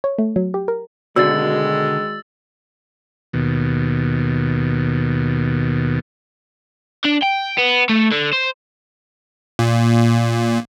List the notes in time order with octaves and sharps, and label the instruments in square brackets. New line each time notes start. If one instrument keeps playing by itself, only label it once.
[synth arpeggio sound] C#5
A3
F#3
G4
A#4
[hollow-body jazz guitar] B2 D3 [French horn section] D#3 G#3 [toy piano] F#4 D5 [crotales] E6 A6
[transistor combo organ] D#2 B2
[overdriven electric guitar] D4
G5
B3
A3
D3
C5
[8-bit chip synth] A#2